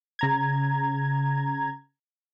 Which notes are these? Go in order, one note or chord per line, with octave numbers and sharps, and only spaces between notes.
C#3 A#5 G#6